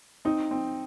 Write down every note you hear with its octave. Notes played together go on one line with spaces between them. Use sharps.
C4 D#4
C4